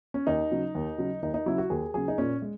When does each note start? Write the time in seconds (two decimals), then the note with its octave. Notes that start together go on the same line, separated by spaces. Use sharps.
0.14 C#4
0.27 D#2 D#4
0.51 C#3 F#3
0.75 D#2
0.98 C#3 F#3
1.22 D#2 D#4
1.34 D#4
1.46 C#3 F#3 E4
1.58 F#4
1.70 D#2 G#4
1.94 C#3 F#3 G#4
2.08 D#4
2.18 A#2 C#4
2.42 G#3